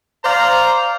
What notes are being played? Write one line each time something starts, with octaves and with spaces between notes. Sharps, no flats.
C5 D5 F5 A#5